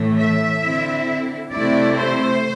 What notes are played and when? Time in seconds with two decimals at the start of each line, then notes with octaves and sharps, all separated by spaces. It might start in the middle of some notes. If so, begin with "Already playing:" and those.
Already playing: A2 E3 A3
0.17 E5
0.62 D3 C4 E4
1.52 C3 A3 E4 D5
1.97 C5